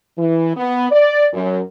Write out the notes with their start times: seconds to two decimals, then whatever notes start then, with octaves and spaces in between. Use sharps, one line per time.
0.18 E3
0.56 B3
0.92 D5
1.34 F#2